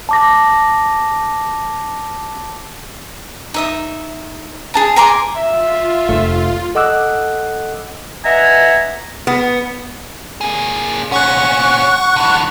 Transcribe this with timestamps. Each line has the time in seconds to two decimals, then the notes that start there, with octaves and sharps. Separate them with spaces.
0.09 A5 D6 A#6
3.54 D#4 E5 D#6
4.74 G#4 A5 A#5
4.96 G#5 A#5 C6 D6
5.37 F4 E5
6.09 F1 A3
6.75 A4 D#5 F#5 D6 E6 F#6
8.24 B4 D#5 E5 F#5 G#5 A#5
9.27 B3
10.41 A#3 G#4
11.12 A#2 C#4 F#5 C#6 F#6
12.16 D3 E3